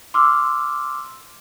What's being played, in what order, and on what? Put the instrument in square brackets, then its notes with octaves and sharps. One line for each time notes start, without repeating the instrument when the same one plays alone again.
[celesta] C6 D6 E6 F6